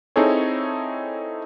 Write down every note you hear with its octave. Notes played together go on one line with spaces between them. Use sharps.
C4 D#4 E4 G#4 A4 C#5